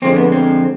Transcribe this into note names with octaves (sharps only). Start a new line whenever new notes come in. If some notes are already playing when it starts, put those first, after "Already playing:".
F2 D3 F3 G#3 C4
B3
C4